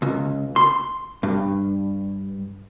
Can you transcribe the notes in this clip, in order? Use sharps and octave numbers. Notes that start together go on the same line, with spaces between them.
C#2
C6
G2